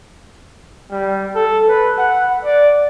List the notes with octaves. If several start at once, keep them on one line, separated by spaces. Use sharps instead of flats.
G3
A4
B4
F#5
D5